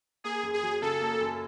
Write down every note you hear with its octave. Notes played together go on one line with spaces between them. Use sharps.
A#3 G#4
F#2
G#4
F#3
C#3 A4
A#3
F#2